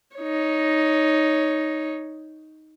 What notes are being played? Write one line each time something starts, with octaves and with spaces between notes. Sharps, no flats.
D#4 C#5